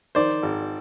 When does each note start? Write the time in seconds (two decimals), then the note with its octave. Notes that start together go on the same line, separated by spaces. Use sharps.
0.15 D#3 C5 D5
0.43 G#1